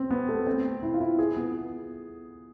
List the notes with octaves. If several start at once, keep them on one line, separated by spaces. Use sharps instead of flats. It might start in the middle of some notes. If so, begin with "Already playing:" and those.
Already playing: C4
B3
A3
C4
E4
F4
E4
G#4
B3